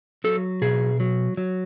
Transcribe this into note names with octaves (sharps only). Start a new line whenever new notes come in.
F#3 A4
B2 G#4
F#3
F#3